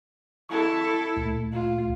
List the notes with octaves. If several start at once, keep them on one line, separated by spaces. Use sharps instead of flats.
E4 A4 C#6
D2 A#2 A3
F4